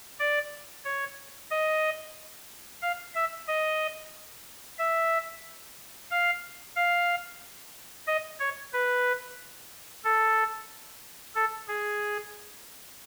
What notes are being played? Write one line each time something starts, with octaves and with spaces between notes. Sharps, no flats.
D5
C#5
D#5
F5
E5
D#5
E5
F5
F5
D#5
C#5
B4
A4
A4
G#4